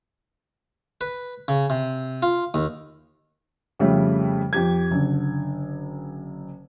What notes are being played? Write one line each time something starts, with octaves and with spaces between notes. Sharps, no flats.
B4
C#3
C3
F4
D#2
F2 C#3 G3 A3
F2 G4 G#6
F#1 D3